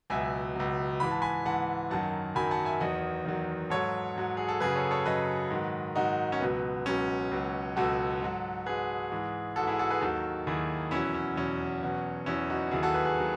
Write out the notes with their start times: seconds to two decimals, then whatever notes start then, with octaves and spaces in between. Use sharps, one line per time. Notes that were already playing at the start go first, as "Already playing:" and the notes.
0.10 C#2 B2 F#3 E5 G#5
0.55 C#2 B2 F#3
1.00 G#2 E3 B5
1.11 A5
1.22 G#5 B5
1.45 G#2 E3 F#5 A5
1.90 F#2 D#3 F#3 F#5 A5
2.35 F#2 D#3 F#3 G#5 B5
2.51 F#5 A5
2.65 E5 G#5
2.80 E2 D#3 F#3 D#5 F#5
3.25 E2 D#3 F#3
3.70 G#2 F#3 A4 C#5
4.16 G#2 F#3
4.37 G#4
4.49 A4
4.60 F#2 C#3 F#3 G#4 B4
4.75 A4 C#5
4.91 A4 C#5
5.06 F#2 C#3 F#3 B4 D#5
5.50 G#2 D#3 F#3
5.95 G#2 D#3 F#3 D#4 F#4
6.32 C#4
6.41 C#2 B2 F#3 B3
6.86 C#2 B2 F#3 C#4
7.31 C#2 B2 F#3
7.76 C#2 B2 F#3 F#4 A4
8.21 G#2 F#3
8.66 G#2 F#3 G#4 B4
9.12 G#2 E3
9.56 G#2 E3 F#4 A4
9.67 E4 G#4
9.79 F#4 A4
9.90 G#4 B4
10.01 D#2 D#3 F#3 F#4 A4
10.47 D#2 D#3 F#3 E4 G#4
10.91 E2 B2 F#3 C#4 E4
11.14 C#4
11.36 E2 B2 F#3 C#4
11.82 E2 B2 F#3
12.26 E2 B2 F#3 C#4 E4
12.50 D#4 F#4
12.71 D#2 D#3 F#3 E4 G#4
12.83 F#4 A4
12.94 G#4 B4
13.05 G#4 B4
13.18 D#3 F#3